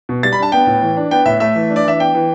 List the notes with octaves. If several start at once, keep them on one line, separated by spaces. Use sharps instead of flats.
B2
G3 A6
B5
D4 A5
B3 G5
A2
E3
D4
B3 G5
A2 E5
A3 E5
E3
D4
D5
E3 E5
B3 G5
E3